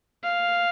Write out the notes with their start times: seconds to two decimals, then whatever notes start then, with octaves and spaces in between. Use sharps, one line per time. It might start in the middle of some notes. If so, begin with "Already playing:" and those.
0.24 F5